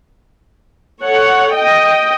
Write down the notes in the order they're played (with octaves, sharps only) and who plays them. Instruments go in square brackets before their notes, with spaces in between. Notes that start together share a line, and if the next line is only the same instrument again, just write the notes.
[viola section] A4 C#5 F#5
D#5 G5